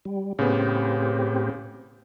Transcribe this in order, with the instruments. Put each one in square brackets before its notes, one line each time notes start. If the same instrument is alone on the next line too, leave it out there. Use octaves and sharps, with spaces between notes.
[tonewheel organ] G3
[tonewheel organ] A2 C4 G4 [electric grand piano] C#3 B3